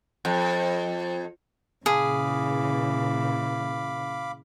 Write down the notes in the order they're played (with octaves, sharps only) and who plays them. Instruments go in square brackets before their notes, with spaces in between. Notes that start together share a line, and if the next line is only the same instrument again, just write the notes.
[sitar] F2
[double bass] A#2 E3 [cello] C#3 [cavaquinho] G#4 [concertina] F5 B5 D6